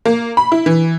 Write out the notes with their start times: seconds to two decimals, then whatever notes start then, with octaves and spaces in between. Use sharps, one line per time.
0.05 A#3
0.37 B5
0.52 E4
0.66 E3